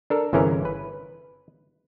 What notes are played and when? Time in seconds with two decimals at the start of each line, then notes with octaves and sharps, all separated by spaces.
0.10 D4 A4 A#4
0.33 G1 C3 E3 C#4 G#4 A#4
0.65 B4